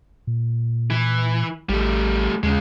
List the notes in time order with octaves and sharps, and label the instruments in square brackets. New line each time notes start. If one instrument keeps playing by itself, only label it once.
[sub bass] A#2
[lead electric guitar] E3
[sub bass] A1 [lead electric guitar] G3 A3
[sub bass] D#2 [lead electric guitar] C#3 G#3